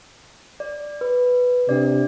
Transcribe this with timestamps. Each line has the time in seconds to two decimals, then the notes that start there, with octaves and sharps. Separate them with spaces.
0.60 D5
1.01 B4
1.69 C3 D4 D5